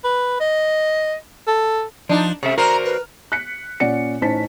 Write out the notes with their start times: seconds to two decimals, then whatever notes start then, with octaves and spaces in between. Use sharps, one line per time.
0.04 B4
0.40 D#5
1.48 A4
2.09 F3 D4 D#4
2.43 C3 C#4 A4 E5
2.58 F#4 A#4 C5 D5 A#5
2.85 B4
3.32 F#6 B6 C#7
3.80 A#2 C#4 D5 F#5 C#7
4.21 A1 C#4 D#4 C5 A5 B6